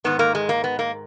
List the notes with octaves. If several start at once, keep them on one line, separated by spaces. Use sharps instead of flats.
G#2 D#3 B3
A#3
G#3
A#3
B3
A#3